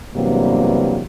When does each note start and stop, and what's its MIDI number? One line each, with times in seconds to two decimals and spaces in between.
0.15 1.02 40
0.15 1.02 43
0.15 1.02 48
0.15 1.02 54
0.15 1.02 55
0.15 1.02 58